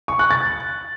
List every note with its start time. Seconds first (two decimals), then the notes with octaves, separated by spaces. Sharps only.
0.08 C#6
0.19 F#6
0.31 A6